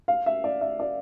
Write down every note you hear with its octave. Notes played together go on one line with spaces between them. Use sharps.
F5
E5
D5
E5
D5